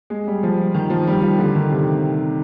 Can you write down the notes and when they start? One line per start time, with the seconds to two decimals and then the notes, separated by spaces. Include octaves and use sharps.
0.10 G#3
0.27 G3
0.43 F3
0.74 D#3
0.90 F3
1.07 G3
1.22 F3
1.39 D3
1.55 D#3
1.71 C3